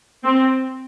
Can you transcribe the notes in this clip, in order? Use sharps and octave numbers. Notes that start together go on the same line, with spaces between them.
C4